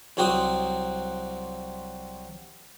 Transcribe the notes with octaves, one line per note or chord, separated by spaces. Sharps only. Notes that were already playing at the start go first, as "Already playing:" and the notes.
C2 F#3 C4 F#4 D#6